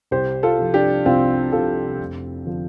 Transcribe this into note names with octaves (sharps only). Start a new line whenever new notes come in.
C2 G4 C5
F4 A4
C3 F3
D4 G4
C2 C4 F4
C3 F3 F4 A4
F1
D3 F3